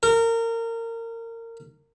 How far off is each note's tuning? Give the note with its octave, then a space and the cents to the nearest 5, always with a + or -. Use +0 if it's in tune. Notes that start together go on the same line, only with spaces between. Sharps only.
A#4 -25